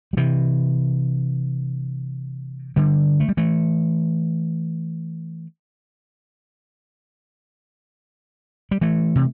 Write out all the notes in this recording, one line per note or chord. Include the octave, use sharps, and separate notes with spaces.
G3
C3 E3
D3 G3
A3
G3
E3 A3
G3
E3 A3
C3